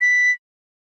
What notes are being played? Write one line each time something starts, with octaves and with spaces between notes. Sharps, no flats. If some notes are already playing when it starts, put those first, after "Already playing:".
B6